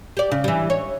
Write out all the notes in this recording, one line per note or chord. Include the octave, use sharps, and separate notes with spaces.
G4 D5
C#3
E3 G3
C#5